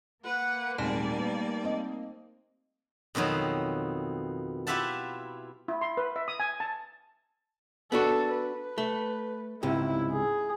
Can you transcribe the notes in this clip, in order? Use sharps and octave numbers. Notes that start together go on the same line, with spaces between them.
A#3 B4 F#5
D#1 G#2 G3 A3 C4 D#4 D5 A5
B3
C4 D#5
F2 B2 D#3 F#3 C4
E4 F4 G4 E5 F#5 A5
E4
C6
B4
E5
D#6
G#5
A5
B3 D4 F#4 A4
B4
A3
C#2 G#2 C3 E4
G#4